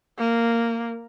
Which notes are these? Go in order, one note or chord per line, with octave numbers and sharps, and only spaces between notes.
A#3